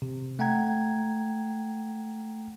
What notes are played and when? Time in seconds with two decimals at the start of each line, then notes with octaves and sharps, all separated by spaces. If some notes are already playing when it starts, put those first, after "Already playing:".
0.02 C3
0.39 A3 F#5 G5 A#5 G#6